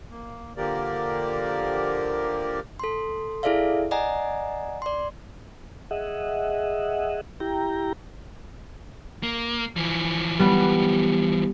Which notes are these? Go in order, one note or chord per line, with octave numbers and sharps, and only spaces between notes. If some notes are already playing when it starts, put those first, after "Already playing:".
A#3
D3 F3 A#3 G4 A#4 D5
A4 C6
E4 G#4 A4 D5 E5 F5
D5 D#5 F#5 G#5 A#5
D5 C6
G#4 D#5 E5 F#5
E4 G4 G5 A#5
A#3
E3 F3
G3 B3